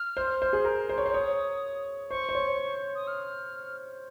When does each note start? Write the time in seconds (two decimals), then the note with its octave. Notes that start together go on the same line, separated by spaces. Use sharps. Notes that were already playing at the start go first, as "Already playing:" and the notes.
Already playing: F6
0.17 C5
0.42 C5
0.53 G#4
0.65 A#4
0.89 C5
0.98 C#5
1.06 C5
1.14 C#5 D#6
2.10 C5 C#6
2.29 C5
2.35 C#5
2.95 D#6
3.07 F6